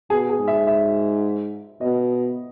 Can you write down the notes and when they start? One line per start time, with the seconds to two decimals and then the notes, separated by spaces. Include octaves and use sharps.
0.10 B2 G#4
0.30 G#4
0.39 G#2
0.48 E5
0.67 E5
1.81 B2 D#5